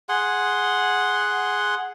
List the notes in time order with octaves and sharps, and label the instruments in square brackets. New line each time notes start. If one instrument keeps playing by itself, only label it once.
[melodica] G#4 F#5 C6